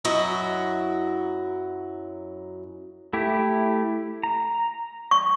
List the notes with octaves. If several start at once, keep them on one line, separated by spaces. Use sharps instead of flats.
F#2 F#3 E4 F#4 D#5
A3 E4 G4
A#5
C#6